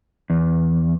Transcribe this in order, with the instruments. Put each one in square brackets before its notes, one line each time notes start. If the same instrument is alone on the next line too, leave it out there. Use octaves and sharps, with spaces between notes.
[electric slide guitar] E2